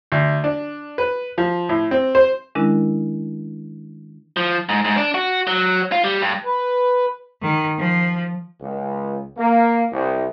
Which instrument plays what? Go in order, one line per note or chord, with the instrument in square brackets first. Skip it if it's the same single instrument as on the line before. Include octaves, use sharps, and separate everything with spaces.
[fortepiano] D2
D4
B4
F3
A2
C4
C5
[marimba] D#3 G#3 C#4 D4 E4 A#4
[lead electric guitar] F3
G#2
G#2
D4
F#4
F#3
F4
G3
G2
[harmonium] B4
[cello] D#3
F3
[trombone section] C#2
A#3
C2